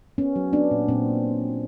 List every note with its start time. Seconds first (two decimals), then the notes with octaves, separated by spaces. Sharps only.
0.18 B3 C#4
0.36 F#3
0.53 B3 D4
0.71 A#2
0.88 A#2 C4